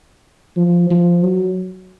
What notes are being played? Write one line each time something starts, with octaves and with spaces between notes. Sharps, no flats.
F3
F3
F#3